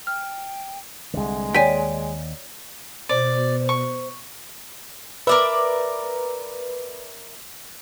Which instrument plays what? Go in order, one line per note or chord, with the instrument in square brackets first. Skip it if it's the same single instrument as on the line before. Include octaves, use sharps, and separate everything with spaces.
[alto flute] G5 [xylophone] F6
[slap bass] C2 D3 [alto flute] G#3
[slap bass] D#2 [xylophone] C#5 D5 B6 [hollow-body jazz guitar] G5 G#5
[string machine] B2 [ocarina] C5 [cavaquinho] D5
[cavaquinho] C#6
[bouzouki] A#4 D5 E5 [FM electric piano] B4